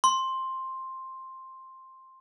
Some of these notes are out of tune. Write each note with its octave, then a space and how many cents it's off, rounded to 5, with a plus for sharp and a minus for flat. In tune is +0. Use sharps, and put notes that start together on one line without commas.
C6 +10